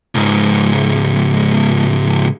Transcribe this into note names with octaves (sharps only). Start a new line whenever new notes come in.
C#2 G#2